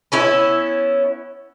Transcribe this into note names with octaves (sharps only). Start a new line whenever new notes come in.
B3 C#4 E4